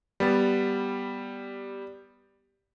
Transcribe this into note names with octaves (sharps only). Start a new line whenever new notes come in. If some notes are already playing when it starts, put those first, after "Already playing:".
G3 B3 A6